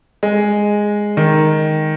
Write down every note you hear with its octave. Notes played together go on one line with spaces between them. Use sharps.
G#3
D#3